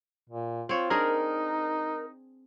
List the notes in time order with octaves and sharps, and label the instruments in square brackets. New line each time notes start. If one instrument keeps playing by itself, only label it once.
[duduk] A#2
[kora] C4 C#5 [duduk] F4
[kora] D4 G#4 [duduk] D#4 [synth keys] A#4